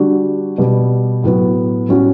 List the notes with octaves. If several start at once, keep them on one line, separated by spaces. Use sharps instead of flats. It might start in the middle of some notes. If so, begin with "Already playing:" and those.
Already playing: D3 G3 D4 F#4
B2 G3 B3
A2 F#3 B3 F#4
A2 G3 C#4 F#4